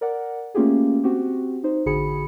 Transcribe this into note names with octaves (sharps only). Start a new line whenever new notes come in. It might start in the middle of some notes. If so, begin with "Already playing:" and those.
A#4 D5 F#5
A3 A#3 C#4 F4 G4 G#4
C4 F#4 G4
D#4 C5
A1 D3 F#4 G#4 B5 C#7